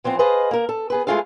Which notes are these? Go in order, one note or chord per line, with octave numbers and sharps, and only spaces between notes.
E3 F3 B3 C4
G#4 B4 C5 D#5 F5 A5
A#3 A#4
A4
B3 G#4 B4
G#3 A3 E4 F4 G#4 F5